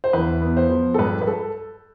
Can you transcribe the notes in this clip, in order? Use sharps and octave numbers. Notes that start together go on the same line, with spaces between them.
C5
E2 B4
B3
C5
F3
A4
G2 B4
B4
A4